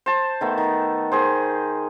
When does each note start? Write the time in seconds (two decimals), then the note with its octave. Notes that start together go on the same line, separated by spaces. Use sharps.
0.06 C5 A5
0.41 D#3 A3 B3
0.58 D#3
1.12 D#3 G#4 C5